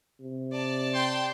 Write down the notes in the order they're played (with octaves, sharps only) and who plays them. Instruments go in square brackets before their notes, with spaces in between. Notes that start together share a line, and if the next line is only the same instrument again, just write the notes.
[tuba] C3
[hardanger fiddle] D5 A5
[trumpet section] G5 C6